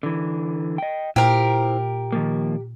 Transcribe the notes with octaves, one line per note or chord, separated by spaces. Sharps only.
D3 E3
D#5 G5
A#2 E4 G4 A#4 C5
D#3 F3 A#3